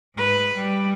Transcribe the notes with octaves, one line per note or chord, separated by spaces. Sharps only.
G#2 B4
G3